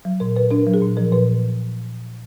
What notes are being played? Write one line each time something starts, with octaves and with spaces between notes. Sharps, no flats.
F#3
A#2 A#4
A#2 B4
D4 A#4
F#3
G#4
A#2
F3 A#4
A#2 B4